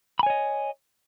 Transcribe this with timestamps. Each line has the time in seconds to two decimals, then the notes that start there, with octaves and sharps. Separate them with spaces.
0.19 B5
0.23 G#5
0.26 C#5
0.30 D#5